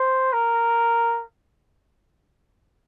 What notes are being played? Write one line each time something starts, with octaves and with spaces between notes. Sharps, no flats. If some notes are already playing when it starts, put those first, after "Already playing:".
Already playing: C5
A#4